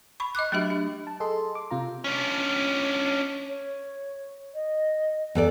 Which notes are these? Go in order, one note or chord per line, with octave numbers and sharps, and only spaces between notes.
B5 C#6
D#5 B5 D6 F#6
F#3 A3 D4 F#4 G4 E5
D4
A5
G#4 A4 D#5 C6
D6
C3 F4 A#5
C#4 D4
C#5
D#5
E2 A4 D5